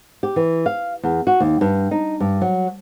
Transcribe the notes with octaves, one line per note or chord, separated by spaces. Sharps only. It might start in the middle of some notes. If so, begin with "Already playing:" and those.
G4
E3
F5
E2
F#4
D#2
G2
D#4
G2
F#3